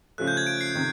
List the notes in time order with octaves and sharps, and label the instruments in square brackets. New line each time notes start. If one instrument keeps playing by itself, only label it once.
[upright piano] C#3 F3 A3 [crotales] F#6
[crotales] G6
G#6
D7
C7
[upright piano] C3 D#3